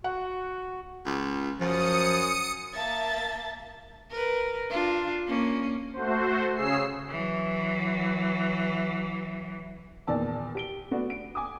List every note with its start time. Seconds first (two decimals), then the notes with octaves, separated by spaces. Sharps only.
0.04 F#4 F#5
1.06 C#2
1.60 F#2 F3 D#6 C#7
2.74 A#3 E5 A5 A6
4.11 A#4 B4
4.70 D4 F4
5.27 A#3 C#4
5.93 A3 F#4 C5
6.55 C#3 C#4 G#4 E6 C7
7.10 E3 F#3
10.07 E2 A#2 D#3 D5 A5 E6
10.55 G4 D7 G7
10.91 A3 B3 D4 F#4
11.10 D7
11.35 G#5 D6 D#6